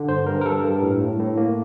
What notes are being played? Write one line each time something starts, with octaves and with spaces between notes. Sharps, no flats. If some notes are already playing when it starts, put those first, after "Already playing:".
Already playing: D3
G2 C5
G2 A#4
A#4
G2 A4
G2
A2
A2
A2
A#3